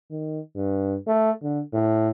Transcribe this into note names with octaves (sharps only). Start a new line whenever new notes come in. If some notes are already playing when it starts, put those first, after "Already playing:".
D#3
G2
A3
D3
A2